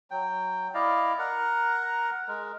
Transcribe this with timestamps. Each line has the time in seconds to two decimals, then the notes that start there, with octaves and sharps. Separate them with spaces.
0.11 F#3 G5
0.74 E4 D5 D#5 F5
1.19 A#4 F#5 A#5
2.28 G#3 A#4